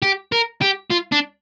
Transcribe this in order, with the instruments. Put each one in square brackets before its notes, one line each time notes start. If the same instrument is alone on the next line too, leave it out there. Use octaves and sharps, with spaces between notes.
[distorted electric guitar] G4
A#4
G4
F4
D4